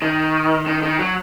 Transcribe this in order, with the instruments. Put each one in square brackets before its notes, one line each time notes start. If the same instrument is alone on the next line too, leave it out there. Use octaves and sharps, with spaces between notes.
[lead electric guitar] D#3
D#3
D#3
F#3